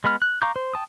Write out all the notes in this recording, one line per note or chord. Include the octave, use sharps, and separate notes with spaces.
G#3 B3 B5 F6
F#6
F5 A#5 C#6 D6 G6
C5
G5 A5 D#6